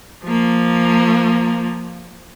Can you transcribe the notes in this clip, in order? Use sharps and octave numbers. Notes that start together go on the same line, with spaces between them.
F3 A#3